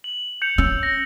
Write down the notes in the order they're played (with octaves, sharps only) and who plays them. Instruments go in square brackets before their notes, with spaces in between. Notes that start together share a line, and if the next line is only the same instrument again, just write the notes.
[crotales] F#7
G6 C#7 F7
[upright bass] C#4 [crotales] E6
[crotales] A#6